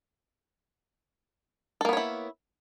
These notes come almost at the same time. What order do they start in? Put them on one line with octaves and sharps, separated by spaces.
A4 A#3 B3 C#5 E4